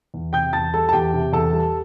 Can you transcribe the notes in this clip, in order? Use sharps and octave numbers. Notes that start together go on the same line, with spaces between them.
E2
C3 G5 G6
E2 A5 A6
G3 A4 A5
A5
E2 G4 G5
C3
E2 A4 A5
G3